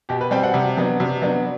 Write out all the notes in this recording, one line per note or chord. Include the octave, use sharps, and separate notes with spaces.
B2 G4
B4
G3 C4 G5
F#5
C3
F#3 B3 D4
C3
F#3 B3 D4